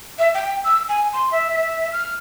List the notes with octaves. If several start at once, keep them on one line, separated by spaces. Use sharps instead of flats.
E5
G5
E6
G#5
C6
E5
E5
F6